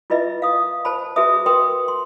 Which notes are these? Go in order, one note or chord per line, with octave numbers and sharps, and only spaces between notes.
E4 F4 B4 D#5 E5
F5 D#6
C5 A5 B5
F#4 G#4 B4 E5 D#6
A#4 B4 G5 C6 D#6
C6